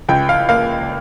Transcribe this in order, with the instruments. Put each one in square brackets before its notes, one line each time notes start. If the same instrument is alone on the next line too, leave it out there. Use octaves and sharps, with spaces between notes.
[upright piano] C#2 G5
F5
A#3 F5